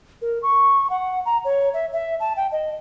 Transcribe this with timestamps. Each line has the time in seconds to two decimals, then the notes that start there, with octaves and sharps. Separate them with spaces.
0.22 A#4
0.43 C#6
0.90 F#5
1.26 A#5
1.45 C#5
1.74 E5
1.93 E5
2.20 A5
2.37 G5
2.52 D#5